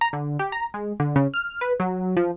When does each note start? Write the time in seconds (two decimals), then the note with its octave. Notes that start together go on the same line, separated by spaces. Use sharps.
0.01 A#5
0.13 D3
0.39 G4
0.52 A#5
0.74 G#3
1.00 D3
1.16 C#3
1.34 F6
1.61 B4
1.80 F#3
2.17 F3